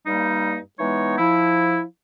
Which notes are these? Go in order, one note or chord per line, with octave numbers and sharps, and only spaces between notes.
G2 G3 A#3 D#4
E3 G#3 B3 D#4 C#5
F3 E4